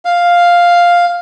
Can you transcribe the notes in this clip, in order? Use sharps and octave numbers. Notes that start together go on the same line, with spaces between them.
F5